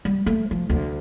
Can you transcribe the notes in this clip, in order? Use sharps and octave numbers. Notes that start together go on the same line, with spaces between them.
G3
A3
F3
D2